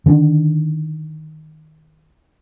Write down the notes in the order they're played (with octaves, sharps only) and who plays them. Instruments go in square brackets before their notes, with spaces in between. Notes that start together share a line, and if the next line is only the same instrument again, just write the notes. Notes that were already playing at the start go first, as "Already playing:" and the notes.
[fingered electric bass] D3 D#3 A#3 D4